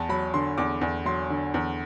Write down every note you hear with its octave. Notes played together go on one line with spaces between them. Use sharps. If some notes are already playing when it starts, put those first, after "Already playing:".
Already playing: E2 A5
F#3 B5
D3 C6
E2 D6
E2
F#3 C6
D3
E2